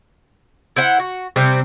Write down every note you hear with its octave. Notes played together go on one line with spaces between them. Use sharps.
E4 C5 F#5
F#4
C3 G3 C4